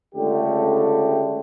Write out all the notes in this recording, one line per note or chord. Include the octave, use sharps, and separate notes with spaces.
C#2 D3 A3 G4